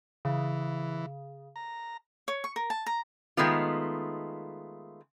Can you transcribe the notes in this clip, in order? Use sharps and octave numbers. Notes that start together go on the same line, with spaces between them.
C#3 E3
A#5
C#5
C#6
A#4
A5
A#5
D#3 G#3 A3 B3 F4